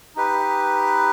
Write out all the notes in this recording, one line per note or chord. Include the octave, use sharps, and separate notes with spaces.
D#4 G4 B4